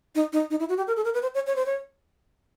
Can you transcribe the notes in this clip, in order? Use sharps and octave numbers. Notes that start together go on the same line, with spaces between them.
D#4
D#4
D#4
E4
F#4
G4
A#4
A4
A#4
B4
C5
C#5
C#5
C5
C#5